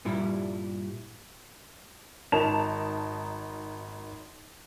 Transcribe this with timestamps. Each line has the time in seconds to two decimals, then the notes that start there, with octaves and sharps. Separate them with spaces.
0.05 G2 A#2 G3 E4
2.32 G#1 D#4 A#4 A5 E7 F7